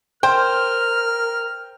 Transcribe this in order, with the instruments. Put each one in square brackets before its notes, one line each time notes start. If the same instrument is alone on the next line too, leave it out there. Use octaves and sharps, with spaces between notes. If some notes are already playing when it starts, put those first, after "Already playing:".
[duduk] A#4 [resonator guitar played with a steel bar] C5 [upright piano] G5 [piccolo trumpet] F6